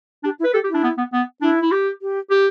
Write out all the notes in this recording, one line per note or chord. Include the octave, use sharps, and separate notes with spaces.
D4 G4
E4
B4
G4 A4
G4
D4 E4
B3
B3
B3
D4 E4
E4
G4
G4
G4